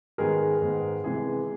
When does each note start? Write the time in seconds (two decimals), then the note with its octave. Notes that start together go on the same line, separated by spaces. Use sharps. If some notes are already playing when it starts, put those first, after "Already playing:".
0.18 G#2 D#3 G#3 B3 G#4 A#4
0.62 G#2 D#3 G#3 B3
1.04 C3 E3 G#3 B3 G#4